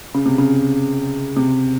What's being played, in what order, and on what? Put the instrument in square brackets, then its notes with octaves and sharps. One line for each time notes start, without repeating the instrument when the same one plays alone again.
[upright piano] C#3
C3
C#3
C3